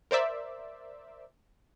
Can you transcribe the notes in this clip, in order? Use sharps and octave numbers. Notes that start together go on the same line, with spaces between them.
A#4 C5 D5 E5